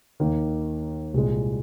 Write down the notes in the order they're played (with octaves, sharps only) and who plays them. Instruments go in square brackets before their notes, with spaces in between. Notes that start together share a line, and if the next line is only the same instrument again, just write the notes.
[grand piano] D#2 D#3 A#3
C2 A#2 G#3